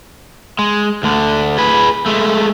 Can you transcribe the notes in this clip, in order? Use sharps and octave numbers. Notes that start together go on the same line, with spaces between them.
G#3
D2 D3
G#4 B4
G#3 A3